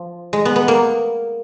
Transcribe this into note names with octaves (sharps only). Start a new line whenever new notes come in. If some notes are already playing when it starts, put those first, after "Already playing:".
Already playing: F3
G#3
B3
B3
A#3